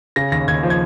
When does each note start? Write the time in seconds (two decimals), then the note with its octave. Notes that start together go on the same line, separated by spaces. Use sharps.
0.16 C#3 A#6
0.32 D#2 A#6
0.48 D#2 G#6
0.63 F3
0.70 G#6